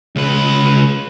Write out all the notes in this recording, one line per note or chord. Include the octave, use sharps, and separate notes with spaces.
C#2 B4